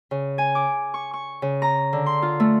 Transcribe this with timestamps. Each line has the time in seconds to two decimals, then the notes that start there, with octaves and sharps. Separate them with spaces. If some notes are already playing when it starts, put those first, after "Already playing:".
0.11 C#3
0.38 G#5
0.55 D6
0.94 C#6
1.13 C#6
1.42 C#3
1.62 A#5
1.93 D3
2.06 C6
2.22 F4
2.40 A3